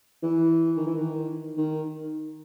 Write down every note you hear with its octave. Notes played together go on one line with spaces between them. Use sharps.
E3
D#3
E3
D#3
D#3